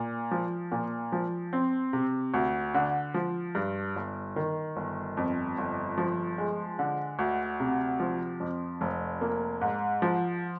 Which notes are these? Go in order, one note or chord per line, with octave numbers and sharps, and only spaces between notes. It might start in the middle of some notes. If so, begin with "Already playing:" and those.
Already playing: A#2
F3
A#2
F3
C4
C3
D2
D3
F3
G2
G1
D#3
G1
F2
G1
F3
G#3
D3
D2
C3
F3
F2
F1
A#3
G#2
F3